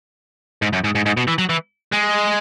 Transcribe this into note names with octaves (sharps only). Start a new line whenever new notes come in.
G#2
F#2
G#2
G#2
G#2
B2
E3
F#3
E3
G#3